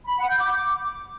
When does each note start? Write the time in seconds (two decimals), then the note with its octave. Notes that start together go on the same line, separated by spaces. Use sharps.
0.06 B5
0.17 F#5
0.28 G6
0.39 D6